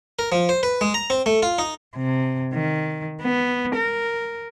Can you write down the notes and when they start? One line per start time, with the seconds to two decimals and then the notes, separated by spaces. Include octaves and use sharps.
0.19 A#4
0.32 F3
0.49 C5
0.63 B4
0.81 G#3
0.94 A#5
1.10 C4
1.26 A3
1.43 F4
1.58 D#4
1.96 C3
2.53 D#3
3.22 B3
3.76 A#4